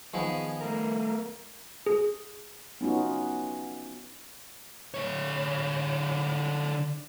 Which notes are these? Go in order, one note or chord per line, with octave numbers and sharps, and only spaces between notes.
D#3 F3 B3 G#4
A3 A#4
G#4
B3 C#4 D#4 F4 F#4
D3 C#5